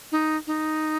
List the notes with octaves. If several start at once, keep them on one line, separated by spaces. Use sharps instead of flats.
D#4
D#4